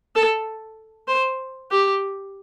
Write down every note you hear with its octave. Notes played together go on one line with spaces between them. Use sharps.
A4
C5
G4